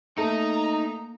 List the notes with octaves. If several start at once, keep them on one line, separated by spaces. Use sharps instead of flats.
A3 A#3 D#4 A#5